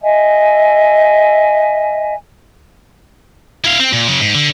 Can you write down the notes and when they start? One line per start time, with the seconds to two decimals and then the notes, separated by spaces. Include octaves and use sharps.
0.01 D#5 E5 G#5
3.65 E4 F5
3.80 C4
3.93 A#2
4.08 C#3 F#3
4.21 G#2
4.35 D3